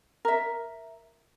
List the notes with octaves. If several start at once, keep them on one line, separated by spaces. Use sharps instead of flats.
A#4 E5